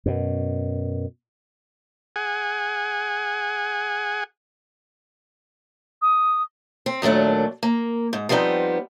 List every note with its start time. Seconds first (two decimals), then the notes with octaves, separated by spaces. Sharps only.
0.06 F#2 B2
2.16 G#4 F#5 G#5
6.02 D#6
6.86 C4
7.02 D#2 A#2 F#3 A3 D4
7.63 A#3
8.13 G#2
8.29 F3 G3 B3 C4 D4 D#4